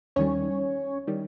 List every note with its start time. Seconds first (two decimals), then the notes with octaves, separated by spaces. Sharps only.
0.16 D#2 D#3 G3 C#4 C#5
1.07 D#3 G3